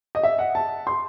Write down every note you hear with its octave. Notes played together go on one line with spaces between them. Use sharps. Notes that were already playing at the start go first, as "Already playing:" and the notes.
D#5
E5
F#5
A5
C6